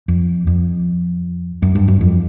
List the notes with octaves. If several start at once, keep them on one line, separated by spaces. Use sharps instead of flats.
F2
F2
F#2
G2
F#2
F2